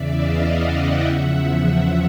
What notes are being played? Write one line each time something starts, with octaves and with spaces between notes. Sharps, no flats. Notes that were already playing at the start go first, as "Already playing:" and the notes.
Already playing: E2 C#3 E3 D5 E5
D#5 F5
E5 F#5
F5 G5
E2 C#3 F3 E5 F#5